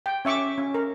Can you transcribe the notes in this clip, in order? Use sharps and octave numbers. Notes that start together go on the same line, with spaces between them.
G5
C#4 E5 C#6 D6
C#4
A#4